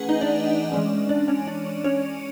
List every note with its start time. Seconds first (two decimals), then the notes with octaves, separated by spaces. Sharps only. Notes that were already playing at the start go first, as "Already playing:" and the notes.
Already playing: E3 A3 C#4 G#4 B4 F#5 G#5
0.09 D#4 D#5
0.21 D4 D5
0.72 E3 G#3 C#4
1.09 D4 D5
1.28 C#4 C#5
1.47 D4 D5
1.84 C#4 C#5